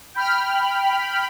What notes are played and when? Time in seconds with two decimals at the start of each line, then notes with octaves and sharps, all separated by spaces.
0.14 G5 B5 F6